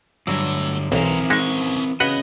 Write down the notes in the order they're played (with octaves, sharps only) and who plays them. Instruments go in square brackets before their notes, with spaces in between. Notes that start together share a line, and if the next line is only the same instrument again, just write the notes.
[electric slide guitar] G2 D3 [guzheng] F#3 G3 [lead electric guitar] A3 E4
[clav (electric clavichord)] B1 [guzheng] E3 [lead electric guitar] F3 A#5 [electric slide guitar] C4 A#4 C5
[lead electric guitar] D#2 C#4 [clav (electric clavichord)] G#3 D#4 E4
[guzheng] C#3 [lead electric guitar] B3 [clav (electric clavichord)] F#4 B4 F#5 [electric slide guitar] D#5